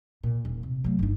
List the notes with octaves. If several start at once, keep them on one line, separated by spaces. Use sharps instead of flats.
A#2
D#1
C3
F#3 A3
G1 D#4